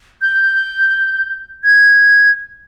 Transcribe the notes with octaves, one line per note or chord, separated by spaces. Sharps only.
G6
G#6